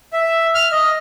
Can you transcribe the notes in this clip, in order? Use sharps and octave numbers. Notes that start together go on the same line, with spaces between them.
E5
F6
D#5